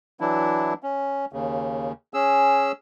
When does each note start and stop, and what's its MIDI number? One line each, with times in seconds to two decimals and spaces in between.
0.20 0.73 52
0.20 0.73 54
0.20 0.73 62
0.20 0.73 64
0.83 1.25 61
1.33 1.92 39
1.33 1.92 49
2.14 2.72 61
2.14 2.72 68
2.14 2.72 88